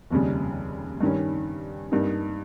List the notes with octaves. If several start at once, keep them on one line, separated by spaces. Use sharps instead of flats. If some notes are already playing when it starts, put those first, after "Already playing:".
F1 D#2 C#3 G3
G2 D#3 G3 C#4
G2 G3 A#3 D#4